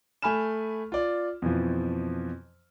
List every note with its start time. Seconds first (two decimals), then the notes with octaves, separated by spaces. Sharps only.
0.22 A3 G#5 B5 F6 E7
0.92 F4 D5
1.42 F2 B2 E3 F3